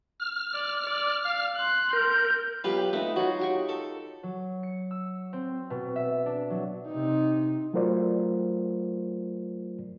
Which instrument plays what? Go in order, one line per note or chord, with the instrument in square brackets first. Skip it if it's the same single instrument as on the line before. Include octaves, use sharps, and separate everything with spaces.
[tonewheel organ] F6
[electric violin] D5
D5
F5
C6 F#6
[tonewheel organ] A#4 [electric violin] G6
[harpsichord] B1 G4 B4 [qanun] F4
[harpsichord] A3 [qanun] D#4 B4
[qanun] F#3 F4 [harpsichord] F#4
[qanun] D#4 G4 C#6
[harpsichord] A4
[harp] F#3
C#7
E6
C4
B2
E5
D4
F#3
[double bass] C3 D#4
[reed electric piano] F#3 A3 F4 A#4 C5 D5